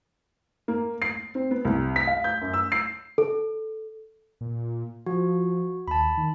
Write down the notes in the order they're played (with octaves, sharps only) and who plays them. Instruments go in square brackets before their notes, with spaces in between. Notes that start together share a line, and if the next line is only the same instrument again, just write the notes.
[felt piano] A#3
C7
C4
B3
C2
B6
F5
G6
F#2
E6
C7
[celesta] A4
[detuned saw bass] A#2
[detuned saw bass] F3 [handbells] F#4
[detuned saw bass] D#2 [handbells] A5 B5
[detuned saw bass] D#3